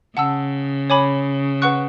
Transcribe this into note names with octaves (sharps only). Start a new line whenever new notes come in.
C#3 F#5 A5 E6
C#5 G#5 B5 D6
B4 F#5 C#6 F#6